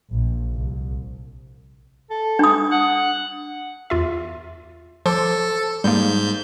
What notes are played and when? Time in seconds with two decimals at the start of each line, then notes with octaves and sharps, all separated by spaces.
0.12 A#1
0.52 C2
2.10 A4
2.39 D4 D#6
2.71 F#5
3.90 E2 F4 E5
5.06 F3 A4 C6 D6
5.84 G#2 G3 A#3 G6